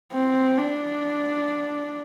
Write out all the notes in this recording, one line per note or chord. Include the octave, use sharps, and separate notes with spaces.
C4
D4